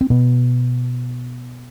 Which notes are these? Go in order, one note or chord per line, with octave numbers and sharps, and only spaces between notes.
C4
B2 B3